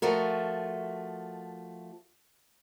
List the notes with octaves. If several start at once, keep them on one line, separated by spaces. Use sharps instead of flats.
F3 A3 F#4 A#4